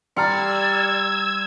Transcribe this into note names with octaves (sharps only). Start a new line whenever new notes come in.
G3 D5 A#5 C6 E6 F6 G#6 C#7